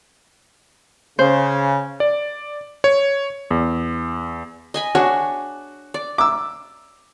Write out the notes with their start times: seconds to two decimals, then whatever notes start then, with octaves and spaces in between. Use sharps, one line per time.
1.19 C#3 C5
2.00 D5
2.84 C#5
3.51 E2
4.74 D#5 G#5 B5
4.95 D4 F#4 G#4 C#5
5.94 D5
6.18 D6 E6